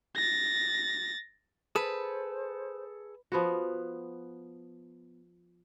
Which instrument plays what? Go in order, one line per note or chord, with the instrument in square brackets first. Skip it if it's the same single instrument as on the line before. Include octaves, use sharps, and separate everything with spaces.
[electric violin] A6 A#6
[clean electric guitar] G#4 A4 A5 [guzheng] B4 [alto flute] C5
[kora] F3 B3 F#4